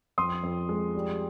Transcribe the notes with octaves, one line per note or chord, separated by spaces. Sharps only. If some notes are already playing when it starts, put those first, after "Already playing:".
F2 C6 D#6
F2
G#3
G3